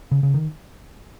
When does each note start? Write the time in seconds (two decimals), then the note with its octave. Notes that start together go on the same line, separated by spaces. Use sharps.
0.11 C#3
0.23 C#3
0.34 D#3